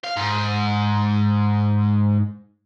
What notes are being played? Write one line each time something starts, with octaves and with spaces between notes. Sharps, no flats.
F5
G#2